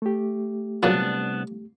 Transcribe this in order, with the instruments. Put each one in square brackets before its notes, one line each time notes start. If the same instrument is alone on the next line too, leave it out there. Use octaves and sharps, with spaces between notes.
[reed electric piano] A3 G4
[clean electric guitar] C2 B3 D4 [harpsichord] A#2 C#3 F#3